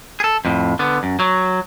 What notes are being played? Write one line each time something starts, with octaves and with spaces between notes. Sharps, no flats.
G#4 A4
F2 A2
D3 B3
F#2
F#3